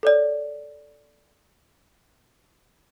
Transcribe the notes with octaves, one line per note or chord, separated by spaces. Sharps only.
A4 C#5 D5